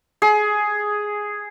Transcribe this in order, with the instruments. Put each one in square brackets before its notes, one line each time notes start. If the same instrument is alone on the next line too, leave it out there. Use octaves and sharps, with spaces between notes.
[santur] G#4